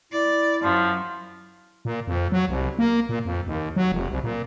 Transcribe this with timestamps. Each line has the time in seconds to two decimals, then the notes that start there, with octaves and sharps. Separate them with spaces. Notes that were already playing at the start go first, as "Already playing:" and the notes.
0.12 E4 D5
0.64 F#2 F3 F#3
1.85 A#2
2.07 F2
2.32 F#3
2.49 C2
2.79 A#3
3.09 A#2
3.25 F2
3.47 D#2
3.76 F#3
3.92 F1
4.10 C2
4.23 A#2